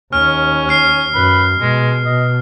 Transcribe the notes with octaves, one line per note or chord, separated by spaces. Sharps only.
D#2 C#4 F6
F6 C7
F#2 B4
B2 G#3
B2 D#5